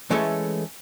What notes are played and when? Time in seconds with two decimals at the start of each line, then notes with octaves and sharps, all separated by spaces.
0.10 E3 G#3 A3 C#4 A4 E5